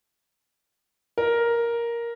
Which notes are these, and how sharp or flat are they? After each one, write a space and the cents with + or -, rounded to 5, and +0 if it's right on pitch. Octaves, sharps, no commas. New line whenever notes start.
A#4 +5